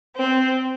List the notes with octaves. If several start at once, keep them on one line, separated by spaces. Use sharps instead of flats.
C4